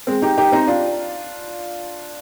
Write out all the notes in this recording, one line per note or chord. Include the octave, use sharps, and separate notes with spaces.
G#3 C4
D#4 G4
D#4 G4
C4 D#4
D4 F4